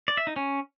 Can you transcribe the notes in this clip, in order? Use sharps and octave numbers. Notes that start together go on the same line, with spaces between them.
D5
E5
D#4
C#4